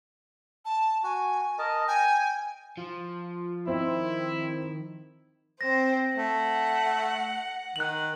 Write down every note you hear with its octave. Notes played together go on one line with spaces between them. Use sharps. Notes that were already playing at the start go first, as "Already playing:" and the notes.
A5
F#4 G#5
A#4 D#5 A5
G5 G#5
F3 F4
D#3 C4 E4
C4 C5 A#6
A3 F#5
D#3 F#6 F#7